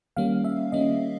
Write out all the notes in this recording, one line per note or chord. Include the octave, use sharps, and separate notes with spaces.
D#3 G3 A#3 C#4 F5
E5
D#3 G3 A#3 C#4 D#5